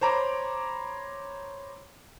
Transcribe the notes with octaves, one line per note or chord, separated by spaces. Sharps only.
C5 C#5 A#5 B5 D6